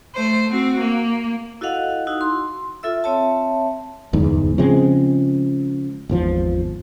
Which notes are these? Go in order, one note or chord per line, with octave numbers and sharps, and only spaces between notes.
A3 C5
C4 F#4
A#3
E4 F#4 A4 D#5 F5 F#5
D#4 E4 F#4
C6
F4 A4 E5 E6
C4 C#5 E5 A5
D1 G1 E2 G#2
C#3 F3 G#3 C4
G#1 E2 F3